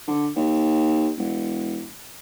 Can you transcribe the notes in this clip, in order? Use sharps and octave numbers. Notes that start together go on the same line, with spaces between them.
D3
D#2
E1